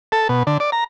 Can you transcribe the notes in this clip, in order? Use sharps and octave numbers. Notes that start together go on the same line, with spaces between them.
A4
B2
D3
D5
A#5